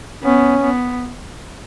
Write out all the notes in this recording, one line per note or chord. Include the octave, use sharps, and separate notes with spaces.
B3 C#4
B3